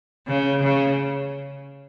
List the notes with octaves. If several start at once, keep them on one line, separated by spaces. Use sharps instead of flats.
C#3
C#3